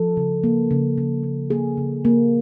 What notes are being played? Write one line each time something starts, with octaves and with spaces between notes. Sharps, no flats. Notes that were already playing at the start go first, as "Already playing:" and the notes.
Already playing: F3 A4
C#3
A#3
C#3
C#3
A#3
A#3 G#4
C#3
A#3